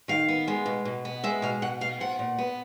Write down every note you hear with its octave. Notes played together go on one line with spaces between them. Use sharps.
D#3 F5
B3
G#3
B2
B2
B3
G#3 E5
B2 F5
B2 F#5
B3 F5
F3 F#5
A#2
B3